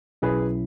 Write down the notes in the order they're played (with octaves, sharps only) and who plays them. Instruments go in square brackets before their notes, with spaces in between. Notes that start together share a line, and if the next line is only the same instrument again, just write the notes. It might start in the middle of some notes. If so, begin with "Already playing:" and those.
[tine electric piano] B1 B2 F#3 C#4 E4 [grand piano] G#4 B4